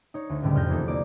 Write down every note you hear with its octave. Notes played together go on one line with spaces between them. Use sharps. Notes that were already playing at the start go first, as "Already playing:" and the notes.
D#4 C#5
D2
C#2 A2 D3 G3 A3
C2 F2 F6 G6 A#6
E2 A#3 D#4 A4
A#3 D#4 D5